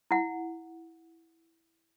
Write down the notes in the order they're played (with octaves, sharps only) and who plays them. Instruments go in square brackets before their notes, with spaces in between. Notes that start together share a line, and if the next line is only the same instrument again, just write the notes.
[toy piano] E4 F#5